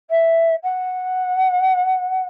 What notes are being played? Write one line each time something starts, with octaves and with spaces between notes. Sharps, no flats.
E5
F#5